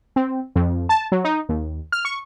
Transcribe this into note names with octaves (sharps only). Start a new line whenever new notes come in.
C4
F2
A5
F#3
D#4
D#2
F6
C#6